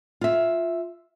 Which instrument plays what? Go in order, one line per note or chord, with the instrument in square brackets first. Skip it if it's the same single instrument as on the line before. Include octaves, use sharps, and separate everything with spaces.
[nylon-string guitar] F4 E5